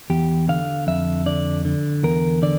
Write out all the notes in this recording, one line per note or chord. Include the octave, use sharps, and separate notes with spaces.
E2 G4
D3 F5
F2 E5
D3 D5
D3
E2 A#4
D3 D5